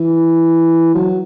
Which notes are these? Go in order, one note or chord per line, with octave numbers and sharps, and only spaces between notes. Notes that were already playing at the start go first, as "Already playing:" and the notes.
Already playing: E3
F#3